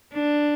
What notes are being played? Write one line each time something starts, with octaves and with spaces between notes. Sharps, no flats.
D4